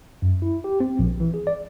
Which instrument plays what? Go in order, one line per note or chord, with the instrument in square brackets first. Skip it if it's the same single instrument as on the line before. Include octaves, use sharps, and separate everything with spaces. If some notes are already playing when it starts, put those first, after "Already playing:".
[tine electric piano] F#2
E4
G4
C4
A#1
E3
G#4
D5